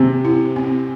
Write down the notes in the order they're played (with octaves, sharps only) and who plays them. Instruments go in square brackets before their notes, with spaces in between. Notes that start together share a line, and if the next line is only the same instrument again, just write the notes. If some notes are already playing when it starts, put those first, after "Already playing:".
Already playing: [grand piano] C3 [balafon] C4
[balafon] E4
C4